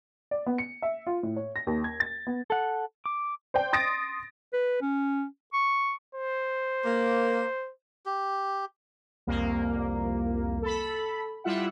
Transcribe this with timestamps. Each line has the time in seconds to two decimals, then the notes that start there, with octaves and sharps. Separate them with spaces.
0.31 D5
0.46 B3
0.58 C#7
0.82 E5
1.07 F4
1.23 A2
1.36 C#5
1.56 A#6
1.67 D#2
1.84 G#6
2.00 A6
2.27 B3
2.50 A4 F#5
3.06 D6
3.54 C5 D5 G5
3.73 C6 D#6 A6 A#6 D7
4.53 B4
4.82 C#4
5.54 C#6
6.15 C5
6.85 A#3
8.06 G4
9.27 C2 F2 A#3
10.62 A4 B5
11.44 G3 E4 F4 E5 F#5